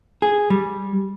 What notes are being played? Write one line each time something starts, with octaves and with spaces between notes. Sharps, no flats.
G#4
G3